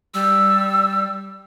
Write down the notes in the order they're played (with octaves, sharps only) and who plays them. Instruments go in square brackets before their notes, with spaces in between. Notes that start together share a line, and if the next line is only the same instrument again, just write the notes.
[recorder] G3 [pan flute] E6